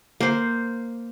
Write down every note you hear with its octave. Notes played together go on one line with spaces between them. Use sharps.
A#3 C5